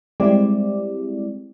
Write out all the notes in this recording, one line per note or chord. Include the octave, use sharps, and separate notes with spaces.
G3 G#3 C4 E4 G4 D5